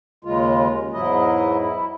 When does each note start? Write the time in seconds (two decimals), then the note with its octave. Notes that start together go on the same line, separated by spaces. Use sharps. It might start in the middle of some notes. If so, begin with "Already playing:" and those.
0.25 D#2 C#3 G#3 F4
0.93 E2 G#2 F#3 E4 D#5
1.60 E4